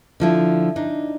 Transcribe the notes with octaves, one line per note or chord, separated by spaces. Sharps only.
D3 F3 E4
D4 D#4